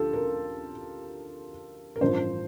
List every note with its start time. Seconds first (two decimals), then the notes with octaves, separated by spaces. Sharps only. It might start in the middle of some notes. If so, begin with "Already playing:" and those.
Already playing: D2 D3 F3 F4 G4 A4
0.13 A#4
1.96 A#4
2.01 A1 G2 F3 C5